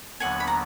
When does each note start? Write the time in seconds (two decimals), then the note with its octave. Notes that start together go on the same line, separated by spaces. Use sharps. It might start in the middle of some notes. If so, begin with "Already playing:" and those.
0.20 D#2 D3 F#3 B3 D4 F#5 G#5
0.40 B5
0.47 A#5